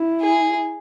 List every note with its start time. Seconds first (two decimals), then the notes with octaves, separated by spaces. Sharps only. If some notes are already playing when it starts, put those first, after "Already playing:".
Already playing: E4
0.20 G#4